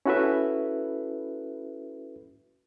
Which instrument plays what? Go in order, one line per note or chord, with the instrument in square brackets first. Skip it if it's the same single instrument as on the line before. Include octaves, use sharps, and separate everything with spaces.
[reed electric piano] C#4 E4 F#4 A4 B4 E5